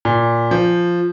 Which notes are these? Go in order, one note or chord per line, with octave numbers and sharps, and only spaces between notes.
A#2
F3